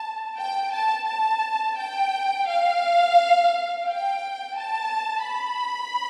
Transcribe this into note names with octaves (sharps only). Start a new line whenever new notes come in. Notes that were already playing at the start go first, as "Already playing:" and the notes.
Already playing: A5
G5
A5
A5
G5
F5
G5
A5
B5